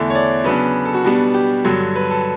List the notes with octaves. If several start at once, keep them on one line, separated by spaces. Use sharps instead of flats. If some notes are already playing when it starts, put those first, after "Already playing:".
Already playing: E2 D3 A3 E4
C#5
D5
C#3 F#3 B3 D4 B4
A4
F#4
B2 G3 B3 D4
G4
G2 D3 F#3
B4
A4